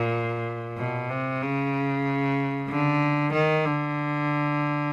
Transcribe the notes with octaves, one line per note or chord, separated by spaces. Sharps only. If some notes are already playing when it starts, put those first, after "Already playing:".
Already playing: A#2
B2
C3
C#3
D3
D#3
D3